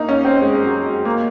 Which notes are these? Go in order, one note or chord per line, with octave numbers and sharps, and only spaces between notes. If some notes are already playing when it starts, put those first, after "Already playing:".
Already playing: A#3 D#4
C#4
C4
G#3
F#3
G#3
A#3